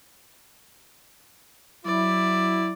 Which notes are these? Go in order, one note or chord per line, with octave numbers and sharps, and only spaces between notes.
F#3 E4 D5